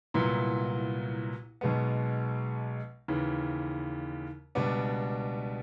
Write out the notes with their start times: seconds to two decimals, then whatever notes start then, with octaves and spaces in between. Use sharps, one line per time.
0.14 C2 A#2 F#3 B3 E4
1.61 B1 B2 G#3 B3
3.08 D#2 C#3 E3
4.55 C#2 B2 G3 B3 D4